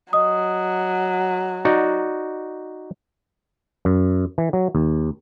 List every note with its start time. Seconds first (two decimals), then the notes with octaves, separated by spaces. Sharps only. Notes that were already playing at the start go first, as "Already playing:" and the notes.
0.13 F#3 D#5 D#6
1.65 D#4 F#4 D5
3.85 F#2
4.38 E3
4.53 F#3
4.75 D#2